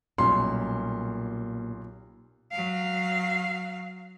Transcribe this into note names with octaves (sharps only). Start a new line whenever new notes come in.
B1 A#2 G3 C#4 C6
F#3 F5